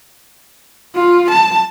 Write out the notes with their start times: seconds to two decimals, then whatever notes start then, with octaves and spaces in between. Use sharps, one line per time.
0.95 F4
1.30 A5